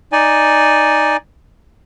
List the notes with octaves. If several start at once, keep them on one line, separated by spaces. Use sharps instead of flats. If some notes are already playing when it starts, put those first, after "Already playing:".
D#4 D5 G#5